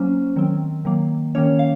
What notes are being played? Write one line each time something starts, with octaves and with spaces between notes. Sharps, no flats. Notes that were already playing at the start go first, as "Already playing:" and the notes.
Already playing: F#3 A#3 C#4 C5
D#3 F#3 C4
D#3 F#3 A#3
D#3 A#3 C#4 C#5
F5